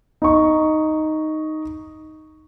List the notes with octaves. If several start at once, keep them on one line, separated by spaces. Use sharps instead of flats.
D#4 C#6